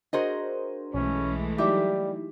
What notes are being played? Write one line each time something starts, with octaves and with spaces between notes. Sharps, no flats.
D4 F#4 G#4 A#4 C5 D#5
B1 E3 G#3 A3 C#4
F#3 G3 D#4 E4 G4 E5